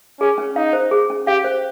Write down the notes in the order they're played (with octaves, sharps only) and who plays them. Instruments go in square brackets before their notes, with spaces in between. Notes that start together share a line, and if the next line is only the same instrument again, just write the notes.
[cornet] C#4 [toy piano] G#4
[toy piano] C#4
[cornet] D#4 [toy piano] F5
[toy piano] C5
G#4
C#4
[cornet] G4 [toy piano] F5
[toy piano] C5